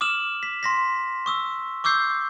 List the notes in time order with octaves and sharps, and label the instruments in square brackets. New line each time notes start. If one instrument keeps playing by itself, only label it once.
[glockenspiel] D6 D#6 F6 E7 F#7
B6
C6 A#6 B6
C#6 D#6 E6
C#6 D6 E6 G6 C7